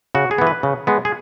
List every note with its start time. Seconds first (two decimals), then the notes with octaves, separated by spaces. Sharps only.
0.15 C#3 F#4
0.31 G#4
0.38 E3 B3
0.47 B4
0.63 C#3
0.87 G#3 B3
1.05 G#4